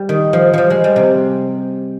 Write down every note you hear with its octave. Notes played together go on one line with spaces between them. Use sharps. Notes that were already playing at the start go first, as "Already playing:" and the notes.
Already playing: G3
D#3
F3
F3 G3
G#3
G3
C3